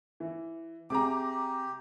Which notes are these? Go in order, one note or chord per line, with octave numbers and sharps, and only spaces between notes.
E3
C3 G4 G#4 A#5 D6